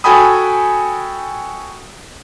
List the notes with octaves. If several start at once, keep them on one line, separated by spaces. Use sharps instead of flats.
F#4 A4 G5 G#5 B5 D#6